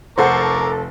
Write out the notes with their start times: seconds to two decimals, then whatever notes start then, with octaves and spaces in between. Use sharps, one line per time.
0.18 F1 A4 A#4 C5 F#5 C#6 D6 C7